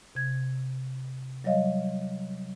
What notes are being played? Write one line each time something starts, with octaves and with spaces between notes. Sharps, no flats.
C3 G#6
F#3 G3 C#5 D#5 F5